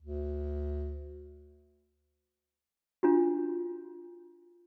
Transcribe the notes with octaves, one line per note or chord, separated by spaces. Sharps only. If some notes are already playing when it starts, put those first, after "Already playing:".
D2
D4 F4 F#4